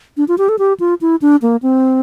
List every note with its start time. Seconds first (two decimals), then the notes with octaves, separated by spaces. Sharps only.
0.17 D4
0.28 F4
0.38 G4
0.49 A4
0.59 G4
0.80 F4
1.01 E4
1.22 D4
1.42 A#3
1.63 C4